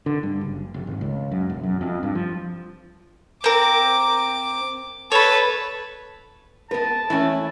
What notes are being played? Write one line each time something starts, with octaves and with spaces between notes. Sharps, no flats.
D3
G2
F#1
F1
G#1
C#2
F#2
E1
F#2
F2
G2
F3
C4 A#4 D6
A4 B4 C#5 B5
B3 A#4 B4 A5
E3 A3 C#4 E4